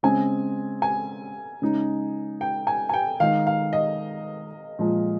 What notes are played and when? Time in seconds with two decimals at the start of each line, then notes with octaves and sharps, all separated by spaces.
0.03 C#3 G#3 C4 G#5
0.82 G#5
1.62 C#3 G#3 D#4
2.41 G5
2.67 G#5
2.89 G#5
2.94 G5
3.20 D#3 G#3 D#4 F5
3.47 F5
3.73 D#5
4.79 A#2 F3 G#3